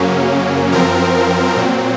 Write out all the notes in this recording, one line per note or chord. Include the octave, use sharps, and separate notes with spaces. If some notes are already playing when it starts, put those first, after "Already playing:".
Already playing: F#2 C#3 F#3 A#3 C#4
F#2 F3 C4 A#4
A#2 F#3 C4